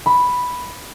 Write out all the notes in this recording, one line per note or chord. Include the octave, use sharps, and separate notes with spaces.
B5